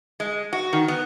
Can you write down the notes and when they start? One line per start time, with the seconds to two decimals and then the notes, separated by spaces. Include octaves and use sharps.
0.20 G#3
0.53 F#4
0.73 D#3
0.88 B3